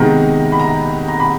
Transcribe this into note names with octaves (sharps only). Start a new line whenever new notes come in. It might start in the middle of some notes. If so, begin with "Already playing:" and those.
Already playing: C3 D#3 G#3 B3 A#5
B5
A#5
A#5
B5